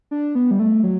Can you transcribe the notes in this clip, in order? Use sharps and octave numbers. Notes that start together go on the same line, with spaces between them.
D4
B3
G3
A3
F#3